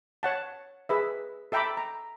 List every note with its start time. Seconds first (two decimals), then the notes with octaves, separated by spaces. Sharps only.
0.23 C#5 F#5 A5
0.89 G#4 B4 E5
1.52 A4 E5 G5 A#5 B5 D6
1.77 A#5